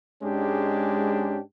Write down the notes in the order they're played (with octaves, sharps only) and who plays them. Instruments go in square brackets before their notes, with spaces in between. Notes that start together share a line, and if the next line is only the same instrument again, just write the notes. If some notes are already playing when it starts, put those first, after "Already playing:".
[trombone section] G#2 G#3 C#4 D4 G4